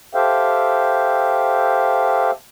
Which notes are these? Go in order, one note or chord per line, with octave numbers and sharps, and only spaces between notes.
G4 A4 C5 E5 F5 G5